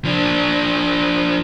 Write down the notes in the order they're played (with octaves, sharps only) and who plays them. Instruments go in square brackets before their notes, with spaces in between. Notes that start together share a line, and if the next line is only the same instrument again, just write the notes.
[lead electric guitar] F3 D4